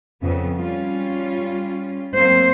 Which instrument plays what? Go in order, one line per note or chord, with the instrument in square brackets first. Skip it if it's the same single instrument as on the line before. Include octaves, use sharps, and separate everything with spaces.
[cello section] F2 C#3 B3
G3 C#4 F4
[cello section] F#3 A#3 C4 [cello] C5